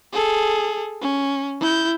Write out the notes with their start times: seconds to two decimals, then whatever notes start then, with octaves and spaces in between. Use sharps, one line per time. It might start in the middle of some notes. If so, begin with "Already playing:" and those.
0.13 G#4 A4
1.01 C#4
1.60 E4 G6